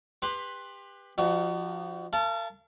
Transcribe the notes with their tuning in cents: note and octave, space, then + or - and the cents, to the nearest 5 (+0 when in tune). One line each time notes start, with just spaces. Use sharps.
G4 +25 B4 +0 C6 +15
F3 +0 D#4 -40 F#4 +30
A#4 -40 F5 -40 A5 -10